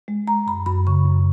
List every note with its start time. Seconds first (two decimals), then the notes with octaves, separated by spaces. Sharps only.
0.08 G#3
0.28 G#3 A#5
0.47 F#2 B5
0.66 F#2 B5
0.87 C#3 C#6
1.06 F#2